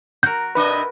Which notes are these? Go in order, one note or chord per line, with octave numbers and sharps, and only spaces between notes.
F#4 A#4 G6
C3 D4 B4 D#5